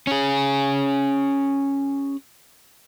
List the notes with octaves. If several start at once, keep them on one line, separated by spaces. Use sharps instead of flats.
C#4 G#4